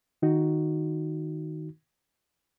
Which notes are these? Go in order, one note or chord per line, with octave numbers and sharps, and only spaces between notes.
D#3 D#4 F#4